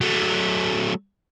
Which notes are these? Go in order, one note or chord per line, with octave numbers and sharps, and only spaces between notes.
F#3 A3